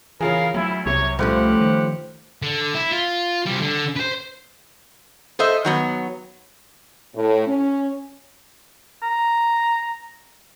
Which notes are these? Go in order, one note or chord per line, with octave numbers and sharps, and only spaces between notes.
C#3 E3 F4 G#4 A#4 F5
D2 F#3 E4
C2 F#2 C3 C#5
G2 F3 A3 C#4 G4 F#5
D#3
D3
E4
F4
C3 G3
D3
B4 C5
A4 C5 D#5 E5
D#3 F#3 B3
A2
C#4
A#5